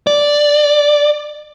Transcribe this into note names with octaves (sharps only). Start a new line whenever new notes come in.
D5